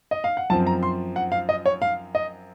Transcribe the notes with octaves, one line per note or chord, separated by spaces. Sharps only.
D#5
F5
F#5
F#2 F3 C4 A5
A#5
C6
F#5
F5
D#5
C#5
F5
D#5